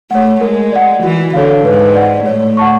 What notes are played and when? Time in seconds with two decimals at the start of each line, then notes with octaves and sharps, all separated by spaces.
0.11 A3 C#5 F#5
0.41 G#3 A#4
0.72 D5 F#5
1.03 E3 F#4
1.34 D3 A4 C#5 F5
1.64 G#2 B4
1.95 D5 F#5
2.26 A2 C#5
2.57 F#5 A5 C#6